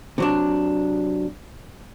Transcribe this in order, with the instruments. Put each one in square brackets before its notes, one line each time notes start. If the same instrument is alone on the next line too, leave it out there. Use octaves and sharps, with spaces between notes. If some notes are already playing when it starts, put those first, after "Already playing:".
[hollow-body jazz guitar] C3 F#3 D4